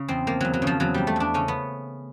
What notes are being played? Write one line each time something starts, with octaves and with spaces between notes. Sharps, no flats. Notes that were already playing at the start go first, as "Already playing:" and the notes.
Already playing: C#3
E2 C4
F3 A#3
E2 F#3
F#3
C#3
F3
E2 F#3
F3 G3
A3
E2 D4
C#3 C#4
B3